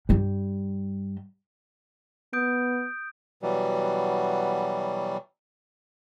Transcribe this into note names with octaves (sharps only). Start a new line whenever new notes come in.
G2 G3
B3 D#6 G6 D7
B2 E3 F#3 G3